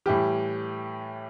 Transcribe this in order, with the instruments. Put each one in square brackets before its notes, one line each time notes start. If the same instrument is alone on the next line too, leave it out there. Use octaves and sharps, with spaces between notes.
[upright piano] A2 E3 G3 G4